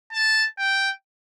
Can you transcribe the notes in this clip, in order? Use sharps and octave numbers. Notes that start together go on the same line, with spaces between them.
A5
G5